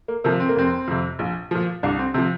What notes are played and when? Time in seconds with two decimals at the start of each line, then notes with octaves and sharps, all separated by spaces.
0.08 A#3
0.24 C3 F3 A#3
0.40 C4
0.49 A#3
0.56 F1 C4
0.88 F2 C3
1.19 A#1
1.51 A#2 F3
1.83 C2 D4
1.99 C4
2.14 C3 C4
2.18 F3